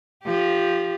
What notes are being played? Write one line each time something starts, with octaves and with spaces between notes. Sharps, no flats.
F3 G4